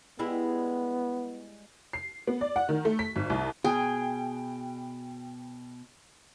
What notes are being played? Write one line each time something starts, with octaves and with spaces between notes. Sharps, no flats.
G3 G#3 B3 E4
C7
B3
D5
F#5
D#3
A3
B6
G#1
C2
B2 G#4 G5